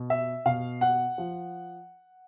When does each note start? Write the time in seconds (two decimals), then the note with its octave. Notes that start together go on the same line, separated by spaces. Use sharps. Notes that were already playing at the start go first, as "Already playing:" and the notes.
Already playing: B2
0.10 E5
0.45 B2 F5
0.81 F#5
1.18 F3